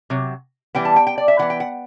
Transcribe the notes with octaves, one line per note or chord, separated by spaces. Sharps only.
C3 F#3
E3 G3 B3 G5
A5
G5
G5
D5
E5
E3 B3 F#5
G5
F#5